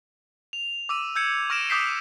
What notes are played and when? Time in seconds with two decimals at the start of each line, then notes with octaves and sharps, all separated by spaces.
0.53 F7
0.89 D6 E6 D#7
1.15 E6 G6 G#6 C#7
1.50 C#6 F6 A#6 D7 E7
1.70 D6 D#6 G6 B6 C7